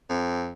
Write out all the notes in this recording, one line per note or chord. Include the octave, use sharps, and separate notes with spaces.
F2